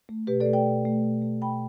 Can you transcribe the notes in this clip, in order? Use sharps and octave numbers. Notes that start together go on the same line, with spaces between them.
A3
B2 G4 B4
A4 D5
A3
D5 G5
B2
A3
B2
A3
B2 G5 B5